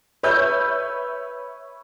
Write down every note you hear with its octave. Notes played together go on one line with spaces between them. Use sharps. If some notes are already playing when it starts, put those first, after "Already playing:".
B4 C#5 E5 E6 G6